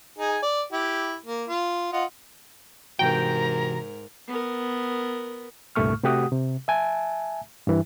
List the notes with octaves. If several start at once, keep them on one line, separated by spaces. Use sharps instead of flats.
D#4 G#4 G#5
D5
E4 G4
A#3
F4
F4 D#5 F#5
G#2 C3 E3 F#4 A#4 G5 A#5
B3 A#4
C2 G2 A#2 A3 C#6 F6
C3 A3 F#4 G4 F#5 D#6
C3
E5 G#5 A5
G2 E3